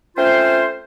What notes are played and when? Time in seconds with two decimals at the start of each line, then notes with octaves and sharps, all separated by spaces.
0.17 A3 C4 C#4 F4 C5